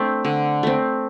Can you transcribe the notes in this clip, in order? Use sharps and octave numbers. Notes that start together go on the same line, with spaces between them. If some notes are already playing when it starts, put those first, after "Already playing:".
Already playing: A3 C4 D4
D3
A3 C4